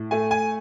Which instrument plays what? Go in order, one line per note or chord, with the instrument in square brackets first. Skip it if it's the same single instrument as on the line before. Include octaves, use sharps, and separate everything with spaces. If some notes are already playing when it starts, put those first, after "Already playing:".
Already playing: [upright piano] A2
A3 G#5
G#5